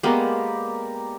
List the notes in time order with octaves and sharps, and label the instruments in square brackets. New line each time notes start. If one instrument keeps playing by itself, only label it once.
[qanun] G#3 A#3 B3 [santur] G4 A#4 D5